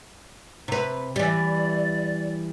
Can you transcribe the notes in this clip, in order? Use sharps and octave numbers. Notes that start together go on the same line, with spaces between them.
C3 B4
E3 G3 D5